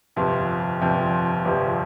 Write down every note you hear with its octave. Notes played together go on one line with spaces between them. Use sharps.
G1 F2 C3
G1 F2 C3
G1 F2 C3